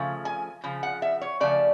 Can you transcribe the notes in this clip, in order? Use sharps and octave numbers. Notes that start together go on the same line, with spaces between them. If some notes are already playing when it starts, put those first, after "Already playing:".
Already playing: C#3 F3 A3
G#5
C#3 F3
F#5
E5
C#5
C#3 F3 A3 D5